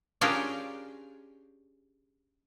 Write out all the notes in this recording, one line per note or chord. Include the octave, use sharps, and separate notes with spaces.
C#4 D4 F4 G4 G#4 A#4